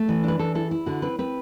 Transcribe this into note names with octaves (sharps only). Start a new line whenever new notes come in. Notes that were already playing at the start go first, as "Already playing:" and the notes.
Already playing: A3
E3
D4 B4
E3 A4
E4 A4
E4
D3 F#4
C4 B4
C4 B4